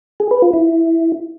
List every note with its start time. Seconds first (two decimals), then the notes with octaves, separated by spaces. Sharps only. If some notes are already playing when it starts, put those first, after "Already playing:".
0.20 G#4
0.31 B4
0.42 F4
0.53 E4